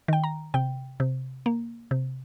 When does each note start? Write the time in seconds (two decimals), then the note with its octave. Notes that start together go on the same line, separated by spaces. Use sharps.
0.08 D#3 G5
0.24 A#5
0.54 C3 G5
1.00 C3
1.46 A#3
1.91 C3